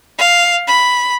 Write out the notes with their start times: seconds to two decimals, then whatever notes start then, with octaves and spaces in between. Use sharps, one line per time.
0.18 F5
0.68 B5